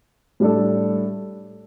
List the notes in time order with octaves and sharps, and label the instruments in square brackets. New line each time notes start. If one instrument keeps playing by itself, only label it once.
[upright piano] A2 G3 D4 A4